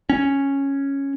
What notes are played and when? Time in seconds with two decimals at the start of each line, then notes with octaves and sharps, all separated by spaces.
0.09 C#4